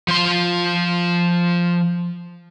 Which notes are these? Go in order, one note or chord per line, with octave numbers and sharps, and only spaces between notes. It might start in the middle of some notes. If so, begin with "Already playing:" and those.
F3 C6